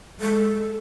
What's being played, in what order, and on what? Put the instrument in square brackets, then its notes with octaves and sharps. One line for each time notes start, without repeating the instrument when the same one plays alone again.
[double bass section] G#3 [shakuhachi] A4